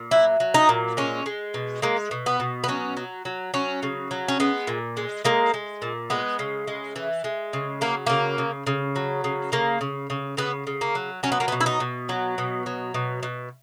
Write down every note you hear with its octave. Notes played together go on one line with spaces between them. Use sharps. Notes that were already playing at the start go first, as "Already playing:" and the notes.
Already playing: A#2
F#3 E4
F#3
D#4
A#2
G#3 C#4
G#3
B2
G#3 A#3
B2
B3
B2
B3
F#3 C#4
F#3
F#3
F#3 C#4
C#3
F#3
C#4
G#3 B3
A#2
G#3
G#3 A#3
G#3
A#2
G#3 B3
C#3
G#3
E3
G#3
C#3
F#3 A#3
C#3 A#3
C#3
C#3
F#3
C#3
C#3 A#3
C#3
C#3
C#3 B3
C#3
A#3
F#3
F#3 C#4
B3
A#3
B3
B2
E4
D#4
B2
F#3
B2
F#3
B2
B2